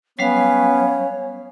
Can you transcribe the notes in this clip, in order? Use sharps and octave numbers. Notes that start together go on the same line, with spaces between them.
F#3 G3 B3 C#4 C#5 F5